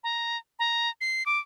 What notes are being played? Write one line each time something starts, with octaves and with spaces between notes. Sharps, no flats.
A#5
A#5
C7
D6